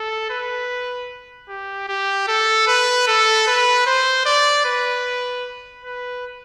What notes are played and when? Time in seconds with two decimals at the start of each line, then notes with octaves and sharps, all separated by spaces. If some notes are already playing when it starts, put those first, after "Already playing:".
Already playing: A4
0.30 B4
1.49 G4
1.88 G4
2.28 A4
2.67 B4
3.07 A4
3.47 B4
3.86 C5
4.26 D5
4.65 B4
5.84 B4